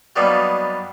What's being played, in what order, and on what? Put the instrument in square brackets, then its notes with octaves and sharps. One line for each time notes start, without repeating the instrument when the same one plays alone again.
[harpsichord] F#3 G3 A#3 B3 D4 D#4